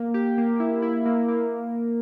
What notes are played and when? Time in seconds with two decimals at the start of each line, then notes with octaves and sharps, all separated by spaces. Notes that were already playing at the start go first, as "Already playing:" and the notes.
Already playing: A#3
0.14 G4
0.38 A#3
0.60 E4
0.82 E4
1.05 A#3
1.28 A#3